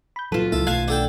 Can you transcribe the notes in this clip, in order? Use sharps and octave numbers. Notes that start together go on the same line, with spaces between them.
B5 G6
A#2 F#3 F4 A4 B4 E7
C#2 F#3 A#3 E4 A4
B1 A3 F5 G#5 A5 F#6 C7
D4 A4 F#5 G5